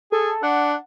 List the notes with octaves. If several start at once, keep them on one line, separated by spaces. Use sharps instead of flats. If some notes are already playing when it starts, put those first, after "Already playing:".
G#4 A4
D4 F#5